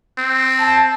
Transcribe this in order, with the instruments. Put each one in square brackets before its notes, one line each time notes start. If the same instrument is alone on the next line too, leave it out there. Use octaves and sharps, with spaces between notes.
[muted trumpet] C4
[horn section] A5